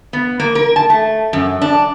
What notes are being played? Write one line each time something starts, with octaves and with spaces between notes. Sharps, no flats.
B3
A#3
A#4
A5
A3
F#2
D4